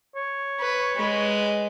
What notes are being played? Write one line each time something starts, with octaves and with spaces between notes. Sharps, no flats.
C#5
B4
G#3 B4